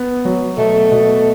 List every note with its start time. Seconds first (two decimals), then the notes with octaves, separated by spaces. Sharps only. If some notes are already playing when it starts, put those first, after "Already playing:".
Already playing: B3
0.25 F#3
0.57 B2 A3
0.91 B2